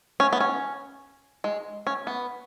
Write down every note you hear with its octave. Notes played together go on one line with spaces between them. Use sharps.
C#4
B3
C#4
G#3
C#4
B3